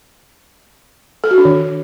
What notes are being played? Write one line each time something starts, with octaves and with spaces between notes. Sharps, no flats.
A4
F#4
D4
D#3